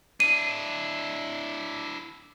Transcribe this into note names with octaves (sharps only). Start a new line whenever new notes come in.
D4 E4 D#7